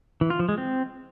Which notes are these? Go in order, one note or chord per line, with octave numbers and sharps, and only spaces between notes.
E3
F4
F3
G#3
C4